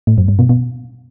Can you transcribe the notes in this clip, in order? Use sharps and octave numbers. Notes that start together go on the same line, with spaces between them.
A2
F#2
G2
B2
B2